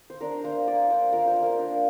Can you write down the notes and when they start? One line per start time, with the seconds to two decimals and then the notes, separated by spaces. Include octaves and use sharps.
0.10 C5
0.21 D4 A#4
0.44 A#3 C5
0.67 A#3 D5
0.89 D4 C5
1.13 F4 A#4
1.27 C5
1.36 A#3
1.43 A#4
1.58 D4